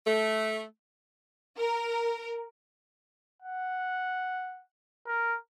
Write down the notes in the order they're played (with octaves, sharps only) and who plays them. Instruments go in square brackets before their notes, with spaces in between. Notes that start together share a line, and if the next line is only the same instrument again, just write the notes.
[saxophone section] A3
[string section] A#4
[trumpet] F#5
A#4